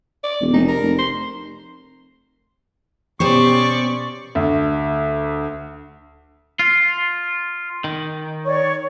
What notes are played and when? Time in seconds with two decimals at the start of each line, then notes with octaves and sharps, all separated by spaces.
0.24 D5
0.41 E1
0.53 F1 D#4
0.68 A#4
0.82 F1
0.99 C6
3.20 B2 B3 C#4 G4 C5 D5 C#6
4.35 D2
6.59 F4
7.84 D#3
8.45 C#5 D5 C#6